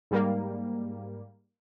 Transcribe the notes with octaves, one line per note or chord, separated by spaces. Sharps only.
G#2 G3 A#3